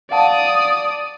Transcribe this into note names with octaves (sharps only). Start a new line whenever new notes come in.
D5 F5 F#5 A5 D#6